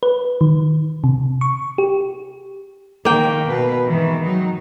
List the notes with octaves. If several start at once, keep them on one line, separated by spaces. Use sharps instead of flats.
B4
D#3
C3
C#6
G4
D#3 A#3 G5
B2 B4
G#2 D#3 E3
F#3 D#4